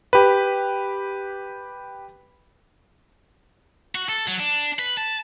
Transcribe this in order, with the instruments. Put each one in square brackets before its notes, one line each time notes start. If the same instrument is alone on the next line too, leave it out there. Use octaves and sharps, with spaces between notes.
[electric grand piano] G4 B4
[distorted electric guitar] F#4
A4
F#3
D4
B4
A5